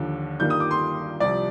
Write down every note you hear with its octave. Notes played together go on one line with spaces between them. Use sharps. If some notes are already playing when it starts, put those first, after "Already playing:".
Already playing: D#2 D3 F3
G2 D#3 G3 A#3 G6
D#6
D6
C6
C2 C3 F3 D5